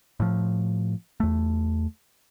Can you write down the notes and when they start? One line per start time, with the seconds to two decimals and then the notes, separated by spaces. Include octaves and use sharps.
0.20 A2 F3
1.20 E2 A3